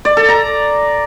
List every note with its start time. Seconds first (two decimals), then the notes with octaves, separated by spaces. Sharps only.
0.05 D5
0.17 A4
0.29 A#5